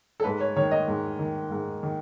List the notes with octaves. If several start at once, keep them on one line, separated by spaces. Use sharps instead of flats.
A4
G#2 B4
C#5
D#3 C#5
D#5
G#2
D#3
G#2
D#3